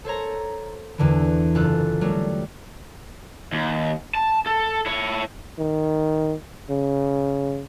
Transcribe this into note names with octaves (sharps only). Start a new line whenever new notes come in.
A4 C5 C#5 A#5
E2 D3 E3
F#1 F4 A4 F#6
F#3 G3 A3
D#2
A5
A4
E4 C#5
D#3
C#3